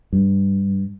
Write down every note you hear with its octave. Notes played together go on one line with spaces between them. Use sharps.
G2